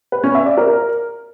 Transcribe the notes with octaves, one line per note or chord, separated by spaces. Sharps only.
B4
C#4
E5
D5
A#4